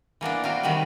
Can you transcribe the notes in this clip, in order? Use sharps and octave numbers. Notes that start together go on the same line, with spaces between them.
E3 A#3 B3 D4
C3 F#4 F5 G5
C3 D#3 G3 F#4 B4